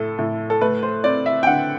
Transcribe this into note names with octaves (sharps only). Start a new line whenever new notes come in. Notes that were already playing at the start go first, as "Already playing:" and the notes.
Already playing: A2 A4
A2
A4
A3 B4
C5
C4 D5
E5
G5
D3 F#5